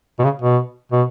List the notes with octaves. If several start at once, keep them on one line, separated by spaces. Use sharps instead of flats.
B2
C#3
B2
B2